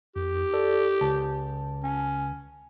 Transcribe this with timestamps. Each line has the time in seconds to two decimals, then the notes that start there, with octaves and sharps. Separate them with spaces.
0.16 F2 G4
0.53 A4 D5
1.01 C#2 A5
1.84 C#4